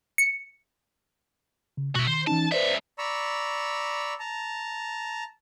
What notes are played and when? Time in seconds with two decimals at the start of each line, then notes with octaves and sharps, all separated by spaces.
0.18 C#7
1.77 C#3
1.95 G1 B2 F#4 E5
2.07 D#3 C5
2.27 E3 C#4 D#4 A5
2.52 C#2 B4 C5 D5 E5
2.98 D5 A#5 B5 C#6 E6
4.20 A5 A#5